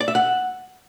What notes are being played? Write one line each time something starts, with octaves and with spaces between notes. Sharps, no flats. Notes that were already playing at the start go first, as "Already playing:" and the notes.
D5
E5
F#5